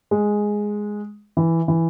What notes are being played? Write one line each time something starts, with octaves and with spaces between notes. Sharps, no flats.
G#3
E3
E3